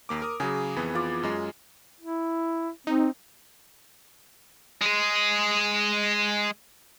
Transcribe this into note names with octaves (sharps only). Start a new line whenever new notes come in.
D#2 A#3 D6
A#4 D#6
C#3 F#3 G#4
F2 E3 B3
F4 D5
F#2 G#3 D#5
E4
C4 D#4
G#3 G#4